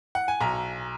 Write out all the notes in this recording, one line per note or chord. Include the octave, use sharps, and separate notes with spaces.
F#5
G#5
B1 A#5